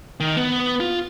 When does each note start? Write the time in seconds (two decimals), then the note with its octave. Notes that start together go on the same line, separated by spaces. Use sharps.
0.20 D#3
0.37 B3
0.80 F4